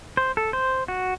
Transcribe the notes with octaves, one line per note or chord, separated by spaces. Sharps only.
C5
A4
C5
F#4